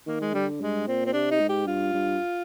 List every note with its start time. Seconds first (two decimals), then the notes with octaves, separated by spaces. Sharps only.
0.07 D#3 A#3
0.21 G#3
0.34 D3 G3
0.60 G2 G#3
0.87 A#2 C4
1.06 C4
1.13 C3 D4
1.31 D#4
1.40 G#2
1.49 G4
1.67 G2 F4
1.94 G2